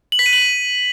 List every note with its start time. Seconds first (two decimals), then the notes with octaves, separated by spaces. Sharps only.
0.12 F#7
0.19 B6
0.26 D#7
0.33 F#7